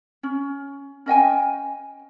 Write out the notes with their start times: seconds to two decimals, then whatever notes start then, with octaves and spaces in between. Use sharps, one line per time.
0.23 C#4
1.06 C#4 D#5 G5 G#5